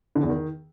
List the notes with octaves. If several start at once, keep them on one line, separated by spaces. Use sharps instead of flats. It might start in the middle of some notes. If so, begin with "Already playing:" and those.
D3
E2
D#3